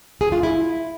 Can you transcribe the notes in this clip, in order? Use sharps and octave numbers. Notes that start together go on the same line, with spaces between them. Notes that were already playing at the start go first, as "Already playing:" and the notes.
G#4
F4
E4